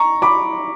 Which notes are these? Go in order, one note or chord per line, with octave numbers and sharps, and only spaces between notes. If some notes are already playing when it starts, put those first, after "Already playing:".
Already playing: A#5 C#6
B5 D6